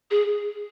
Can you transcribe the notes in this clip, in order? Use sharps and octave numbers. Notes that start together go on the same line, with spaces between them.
G#4